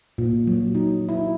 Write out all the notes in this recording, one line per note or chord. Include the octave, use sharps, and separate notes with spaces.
A#2
F#3
D#4
E4